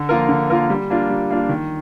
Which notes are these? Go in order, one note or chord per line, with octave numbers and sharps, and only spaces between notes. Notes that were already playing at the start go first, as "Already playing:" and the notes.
Already playing: D3
F3 A#3 F4 A#4
D3
F3 A#3 F4 A#4
G3
A#3 D4 F4
G3
A#3 D4 F4
D#3